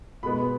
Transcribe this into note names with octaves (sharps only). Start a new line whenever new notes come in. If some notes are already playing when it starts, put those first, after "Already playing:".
B2 G#3 B3 B5